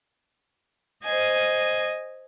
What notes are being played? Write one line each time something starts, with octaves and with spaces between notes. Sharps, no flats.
C5 D#5 G#5